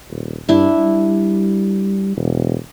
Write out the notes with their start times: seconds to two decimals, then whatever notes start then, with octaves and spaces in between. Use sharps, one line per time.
0.11 D#1
0.49 G2 D4 E4
0.79 G3
2.17 E1